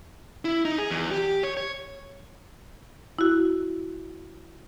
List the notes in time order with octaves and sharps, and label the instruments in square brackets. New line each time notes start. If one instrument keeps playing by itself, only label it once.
[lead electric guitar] E4
D#4
G#4
E2
G4
C#5
C#5
[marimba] E4 F#4